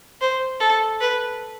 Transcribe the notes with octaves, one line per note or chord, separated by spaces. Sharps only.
C5
A4
B4